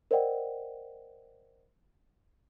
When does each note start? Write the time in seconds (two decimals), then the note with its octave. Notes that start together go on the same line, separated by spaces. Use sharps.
0.11 A#4 C5 D5 D#5 F#5 G5